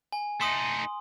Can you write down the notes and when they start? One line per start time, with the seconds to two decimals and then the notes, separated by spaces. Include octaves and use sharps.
0.12 G#5
0.41 A3 D#4 C6 D#6